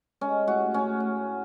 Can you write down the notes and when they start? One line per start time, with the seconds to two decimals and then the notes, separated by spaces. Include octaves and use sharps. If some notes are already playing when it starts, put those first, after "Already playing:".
0.21 G#3 C#4
0.47 A2 F#4
0.74 A2 C#4
1.00 A2